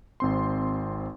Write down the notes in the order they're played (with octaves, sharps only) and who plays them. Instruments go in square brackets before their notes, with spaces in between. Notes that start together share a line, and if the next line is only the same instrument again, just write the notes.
[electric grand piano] G#1 C4 C6